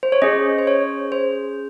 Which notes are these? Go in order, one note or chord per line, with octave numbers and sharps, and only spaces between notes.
C5
C#5
C#4 G#4 D#5
C5
C#5
C5